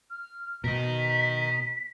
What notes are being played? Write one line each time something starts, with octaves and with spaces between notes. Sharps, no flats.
F6
B2 A#4 D#5 B6